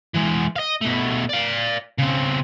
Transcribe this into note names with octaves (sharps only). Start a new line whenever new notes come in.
E3 G#3
D#5 F5
B2 A3
D5 F5
C#3 C4